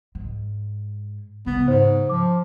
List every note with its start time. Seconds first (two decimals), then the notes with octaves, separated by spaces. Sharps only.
0.15 G#2
1.46 C#3 G#3 B3
1.68 G#2 C5
2.09 F3 D6